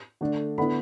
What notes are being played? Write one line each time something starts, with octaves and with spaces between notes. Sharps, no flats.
D3 A3 D4
D3 B3 E4 B5